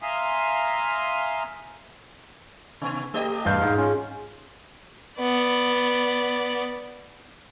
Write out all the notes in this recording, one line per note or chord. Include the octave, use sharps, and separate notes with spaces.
E5 F5 G#5 A#5 C6 D#6
C3 B3
A3 G4 D#5
E1 G2 F5 G6
G#2 G#4
C#4 F4
B3 D5